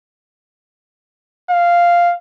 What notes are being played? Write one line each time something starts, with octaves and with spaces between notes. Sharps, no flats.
F5